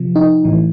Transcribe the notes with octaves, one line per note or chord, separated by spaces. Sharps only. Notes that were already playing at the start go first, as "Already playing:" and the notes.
Already playing: C3 F3
D#4
A2 E3